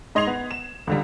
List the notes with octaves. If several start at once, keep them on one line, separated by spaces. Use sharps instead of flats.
G#2 D#5 C6 G#6 C7 F7
B3
E7
C#2 D3 G3